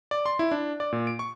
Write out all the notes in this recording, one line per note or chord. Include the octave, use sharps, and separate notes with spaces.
D5
C6
E4
D4
D5
A#2
D7
C#6